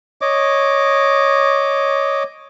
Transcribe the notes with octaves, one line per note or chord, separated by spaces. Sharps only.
C#5 D#5 D6